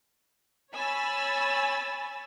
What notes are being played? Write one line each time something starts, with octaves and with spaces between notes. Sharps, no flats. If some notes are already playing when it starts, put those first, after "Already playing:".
C#5 G#5 B5 E6 A6